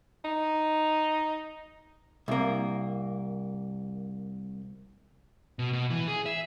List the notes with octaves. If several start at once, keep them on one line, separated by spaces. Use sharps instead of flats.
D#4
C2 A#3
B2
B2
E3
G#4
E5